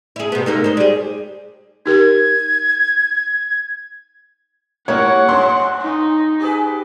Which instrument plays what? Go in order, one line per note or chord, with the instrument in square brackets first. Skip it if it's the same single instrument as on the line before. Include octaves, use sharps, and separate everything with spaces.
[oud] E4 G#4
C3 B3
G#2 A3 A#3
G#3 C5
G3 G#4
[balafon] D#4 G4 A#4 [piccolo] G#6
[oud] A#3 E4 G4 [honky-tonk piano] C#5 [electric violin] F#5
[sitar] G2 [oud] C#5 [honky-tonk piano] C6
[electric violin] D#4
[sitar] G4 G#4 B4